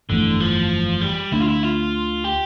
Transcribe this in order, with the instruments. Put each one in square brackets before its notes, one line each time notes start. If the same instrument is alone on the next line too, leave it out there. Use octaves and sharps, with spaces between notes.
[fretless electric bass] G1 F2 E3 A3 [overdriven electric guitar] D3
[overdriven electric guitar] F3
G3
[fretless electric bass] D2 D3 A3 D4 [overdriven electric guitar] E4
[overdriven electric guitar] F4
E4
F4
G4